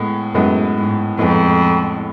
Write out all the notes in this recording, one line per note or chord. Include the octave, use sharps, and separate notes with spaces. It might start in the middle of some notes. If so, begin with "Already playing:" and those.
Already playing: A2 G#3 B3
F#2 A2 G#3 B3
G#2
F2 A2 G#3 B3